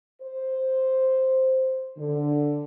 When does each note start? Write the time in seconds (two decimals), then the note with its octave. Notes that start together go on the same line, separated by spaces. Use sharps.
0.22 C5
1.98 D3